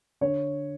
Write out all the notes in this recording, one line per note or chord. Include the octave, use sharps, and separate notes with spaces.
D3 C#5